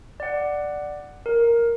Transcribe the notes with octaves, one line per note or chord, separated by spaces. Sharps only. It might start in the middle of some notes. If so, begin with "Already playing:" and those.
D5 F#5
A#4